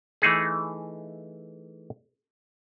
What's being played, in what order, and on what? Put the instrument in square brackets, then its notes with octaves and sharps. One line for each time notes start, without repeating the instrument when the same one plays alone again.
[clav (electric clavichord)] E3 A3 D#4 G#4